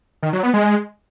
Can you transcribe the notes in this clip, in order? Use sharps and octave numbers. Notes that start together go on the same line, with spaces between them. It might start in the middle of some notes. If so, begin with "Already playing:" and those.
D#3
F#3
B3
G#3